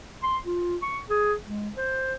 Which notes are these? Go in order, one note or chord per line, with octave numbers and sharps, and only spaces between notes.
C6
F4
C#6
G#4
G#3
C5